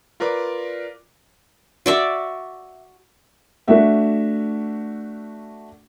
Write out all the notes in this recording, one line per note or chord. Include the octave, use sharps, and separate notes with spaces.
F4 A#4 B4 D5 D6
F#4 D5 E5
A3 D4 F#4 E5